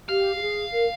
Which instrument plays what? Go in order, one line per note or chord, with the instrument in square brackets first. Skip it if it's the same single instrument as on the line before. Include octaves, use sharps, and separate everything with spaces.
[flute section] G4 [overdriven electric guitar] F5
[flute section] G4
G#4
A#4